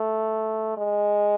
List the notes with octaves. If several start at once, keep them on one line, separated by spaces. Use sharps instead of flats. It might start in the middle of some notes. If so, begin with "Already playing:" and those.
Already playing: A3
G#3